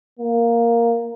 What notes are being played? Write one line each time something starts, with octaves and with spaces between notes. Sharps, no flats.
A#3